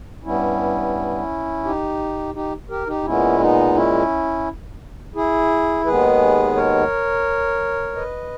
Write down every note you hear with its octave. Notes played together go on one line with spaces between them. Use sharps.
G2 G3 B3 C#4 E4
D#4 G4
D#4 G4
G4 A#4
D#4 G4
A#2 G#3 B3 C#4 E4
B3 D#4
C#4 E4
E4 G#4
D#2 D#3 G#3 B3 G#4 B4
A#4 C#5
B4 D#5